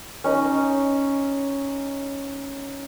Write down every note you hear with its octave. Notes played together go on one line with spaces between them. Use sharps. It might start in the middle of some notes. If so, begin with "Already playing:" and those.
C#4 D#4